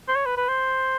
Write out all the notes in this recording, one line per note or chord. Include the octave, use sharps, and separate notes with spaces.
C5
C#5
B4
B4
C5